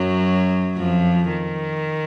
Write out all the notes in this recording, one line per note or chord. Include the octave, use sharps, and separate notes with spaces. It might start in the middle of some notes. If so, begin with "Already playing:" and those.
Already playing: F#2 F#3
F2 F3
D#3